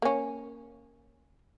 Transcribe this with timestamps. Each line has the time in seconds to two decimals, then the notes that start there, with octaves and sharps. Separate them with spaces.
0.02 A#3 C#4